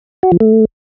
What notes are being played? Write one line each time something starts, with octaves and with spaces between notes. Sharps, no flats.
F#4
F3
A3